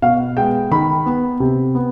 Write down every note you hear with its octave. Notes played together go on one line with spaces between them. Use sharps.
B2 F5
G#3 B3 G5
D#3 B5
B3
C3
B3